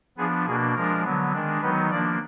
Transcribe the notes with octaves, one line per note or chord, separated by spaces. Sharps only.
F3 B3 D4 G#4
B2 A#3 D4 G#4
F3 G#3 D4 A#4
D3 F#3 B3
D#3 G#3 D4
D#3 F#3 B3 D#4 B4
F3 A#3 D4 D5